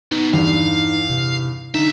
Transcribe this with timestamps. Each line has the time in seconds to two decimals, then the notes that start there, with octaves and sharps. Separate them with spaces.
0.12 B2 D#4
0.33 E2 G2 F5
1.10 C3
1.75 B1 D3 D#4 E5